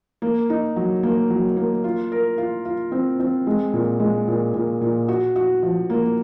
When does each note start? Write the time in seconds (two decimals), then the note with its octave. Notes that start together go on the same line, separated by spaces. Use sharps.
0.22 A#3
0.50 D#4
0.76 F#3
1.03 A#3
1.30 F#3
1.57 A#3
1.84 F4
2.12 A#4
2.38 F4
2.65 F4
2.92 C4
3.20 C4
3.47 G#3
3.73 A#2
4.00 G#3
4.28 A#2
4.54 A#2
4.81 A#2
5.08 F#4
5.36 F#4
5.63 F3
5.90 A#3